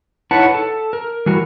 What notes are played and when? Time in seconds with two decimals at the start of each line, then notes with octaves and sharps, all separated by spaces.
0.31 D#4 E4 B4 C#5 F#5 A5
0.54 A4
0.93 A#4
1.26 E3 G3 F#4 A#4